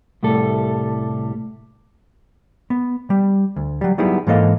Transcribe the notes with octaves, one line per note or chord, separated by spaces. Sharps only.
C2 A2 G3 A4
B3
G3
D2
F#3 G3
F#3 G3 B3 D#4 E4 G#4
G#2 E3 A#3 A4 D#5 F5